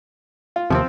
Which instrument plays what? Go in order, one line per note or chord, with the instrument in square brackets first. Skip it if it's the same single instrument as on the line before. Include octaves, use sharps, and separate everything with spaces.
[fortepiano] F4
[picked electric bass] D#2 C3 [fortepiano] F3 C4